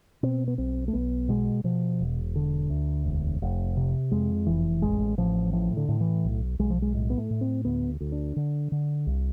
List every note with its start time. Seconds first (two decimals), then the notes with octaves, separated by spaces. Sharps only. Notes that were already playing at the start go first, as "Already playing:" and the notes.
0.23 B2 C4
0.48 B3
0.58 B1 C4
0.88 A3
0.93 B1 B3
1.29 B2 G#3
1.64 B2 F3
2.00 E1
2.36 D3
2.70 D2
3.05 E1
3.42 F1
3.77 C3
4.11 F2 G#3
4.47 F1 E3
4.82 A1 G#3
5.18 A1 F3
5.53 A2 F3
5.77 D3
5.88 A2
6.01 E3
6.24 B1
6.59 B1 G#3
6.70 F3
6.82 G#3
6.94 A2 G#3
7.10 B3
7.18 A3
7.30 A2
7.41 C4
7.65 D2 B3
8.00 D2
8.12 D4
8.36 D3
8.72 D3
9.07 C2